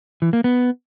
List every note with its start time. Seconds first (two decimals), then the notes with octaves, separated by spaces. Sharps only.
0.22 E3
0.33 A#3
0.44 B3